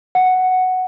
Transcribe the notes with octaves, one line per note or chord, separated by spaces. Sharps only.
F#5